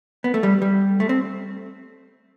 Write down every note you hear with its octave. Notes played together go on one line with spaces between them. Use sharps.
B3
A3
G3
G3
A3
C4